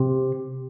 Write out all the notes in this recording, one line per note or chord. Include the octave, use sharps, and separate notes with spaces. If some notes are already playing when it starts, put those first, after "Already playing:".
Already playing: C3